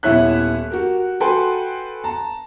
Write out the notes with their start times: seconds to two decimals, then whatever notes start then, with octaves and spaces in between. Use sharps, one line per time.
0.03 D#1 B3 E4 C#5 E5 F#6
0.70 F#4 G4 A#4
1.20 F#4 A4 B4 G5 G#5 C6
2.04 A5 A#5